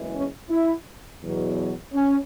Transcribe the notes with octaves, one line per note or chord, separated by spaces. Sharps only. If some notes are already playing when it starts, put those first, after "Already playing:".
Already playing: F#1 E2 E3 G#3
C#4
E4
E2 B2 F#3
C#4